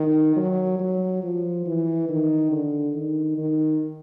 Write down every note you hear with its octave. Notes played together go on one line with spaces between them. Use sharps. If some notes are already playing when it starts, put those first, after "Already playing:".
Already playing: D#3
F#3
F#3
F3
E3
D#3
D3
D#3
D#3